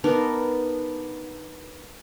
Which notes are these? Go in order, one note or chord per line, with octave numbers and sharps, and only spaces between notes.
B3 D4 D#4 A#4